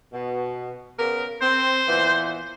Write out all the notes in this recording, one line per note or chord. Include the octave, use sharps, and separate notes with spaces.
B2
C#3 B3 A#4
C4 C5
A#2 E3 B3